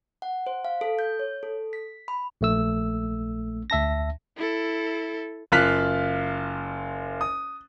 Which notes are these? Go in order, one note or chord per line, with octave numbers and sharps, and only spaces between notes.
F#5
C5
F5
A4
G6
C#5
A4
B6
B5
A#1 A3 E6
D2 E5 A5 A#6
E4 A4
F#1 F4 F5 F6 F#6 B6
D#6